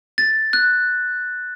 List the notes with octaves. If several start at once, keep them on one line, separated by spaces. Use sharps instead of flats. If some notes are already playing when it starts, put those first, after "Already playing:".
A6
F#6